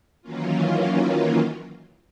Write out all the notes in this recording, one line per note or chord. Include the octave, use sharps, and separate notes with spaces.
D#3 E3 F#3 A#3 C#4 F4